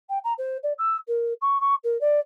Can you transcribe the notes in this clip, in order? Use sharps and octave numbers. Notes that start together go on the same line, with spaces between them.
G5
A#5
C5
D5
E6
A#4
C#6
C#6
A#4
D5